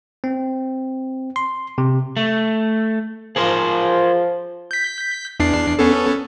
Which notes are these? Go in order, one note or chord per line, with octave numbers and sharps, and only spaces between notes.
C4
C6
C3
A3
F3 G#4 A#4 C5
G6 B6
E2 D4 C7
B3 C#4 A4